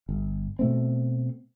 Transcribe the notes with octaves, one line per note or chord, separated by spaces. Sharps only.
G1
B2 A3 C4